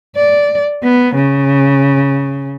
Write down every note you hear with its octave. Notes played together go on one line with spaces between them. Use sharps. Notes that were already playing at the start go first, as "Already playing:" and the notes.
D5
B3
C#3